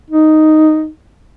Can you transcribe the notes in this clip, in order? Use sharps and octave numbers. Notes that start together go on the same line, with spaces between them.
D#4